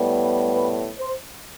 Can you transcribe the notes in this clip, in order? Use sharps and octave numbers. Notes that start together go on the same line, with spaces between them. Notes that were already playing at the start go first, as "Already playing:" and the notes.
Already playing: A2 G3 B3
B4
C5